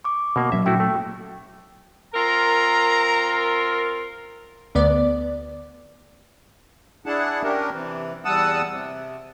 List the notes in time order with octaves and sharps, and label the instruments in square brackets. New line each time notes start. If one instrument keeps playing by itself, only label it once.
[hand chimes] C#6 D6
[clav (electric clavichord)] B2 A#3
[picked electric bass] A#2 F#3 C#4 [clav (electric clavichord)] E5
[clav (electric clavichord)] A3 E4 F#4 [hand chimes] G5
[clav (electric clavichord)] A3
[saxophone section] C4 F4 A#4 [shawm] A#5
[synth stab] D2 B3 D5
[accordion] D4 E4 G#4 F#5 A5
C#4 D4 G4 A#4
C3 E3
E2 G3 F#5 A5 D#6 E6
C3